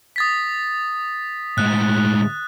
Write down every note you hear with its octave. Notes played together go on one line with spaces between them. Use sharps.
D#6 A6 B6
A2 G#3 F#6